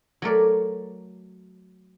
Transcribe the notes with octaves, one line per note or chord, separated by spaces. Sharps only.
F#3 A3 A#4 D5